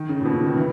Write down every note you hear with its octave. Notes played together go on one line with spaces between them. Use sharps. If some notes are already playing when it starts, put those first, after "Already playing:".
Already playing: D#3
C#3
A#2
B2
C#3
D#3
E3